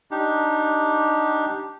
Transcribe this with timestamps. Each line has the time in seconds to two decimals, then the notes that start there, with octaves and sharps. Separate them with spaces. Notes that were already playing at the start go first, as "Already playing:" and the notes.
0.11 D4 D#4 G4